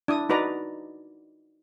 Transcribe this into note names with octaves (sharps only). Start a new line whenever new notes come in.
D4 E4 D#6
D#4 F#4 B4 D5 A#5